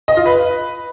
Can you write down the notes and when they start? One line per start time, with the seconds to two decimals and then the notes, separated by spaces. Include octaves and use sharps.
0.08 D#5
0.17 F4
0.26 B4